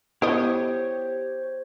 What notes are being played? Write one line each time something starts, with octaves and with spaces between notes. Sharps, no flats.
B3 E4 G4 A4 C5 C#5 D#5 C#6